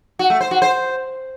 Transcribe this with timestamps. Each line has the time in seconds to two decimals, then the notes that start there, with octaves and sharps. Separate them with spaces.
0.19 F#4
0.30 A3
0.41 C5
0.51 F#4
0.62 C5